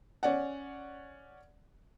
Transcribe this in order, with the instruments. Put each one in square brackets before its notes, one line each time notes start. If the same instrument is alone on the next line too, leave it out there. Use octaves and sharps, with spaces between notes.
[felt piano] C#4 D5 F#5